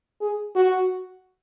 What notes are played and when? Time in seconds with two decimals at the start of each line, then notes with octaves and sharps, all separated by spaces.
0.21 G#4
0.56 F#4